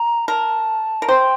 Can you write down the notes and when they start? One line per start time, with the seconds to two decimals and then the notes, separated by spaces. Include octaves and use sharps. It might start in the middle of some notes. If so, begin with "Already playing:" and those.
Already playing: A#5
0.28 A#4 A5
1.02 A#4
1.08 C5 G5